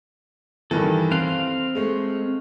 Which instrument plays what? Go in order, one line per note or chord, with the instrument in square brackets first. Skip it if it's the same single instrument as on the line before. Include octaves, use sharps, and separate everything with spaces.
[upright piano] G2 D#3 E3 [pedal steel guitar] A4
[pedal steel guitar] C4 F5 C6 [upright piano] F#6
[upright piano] G#3 A3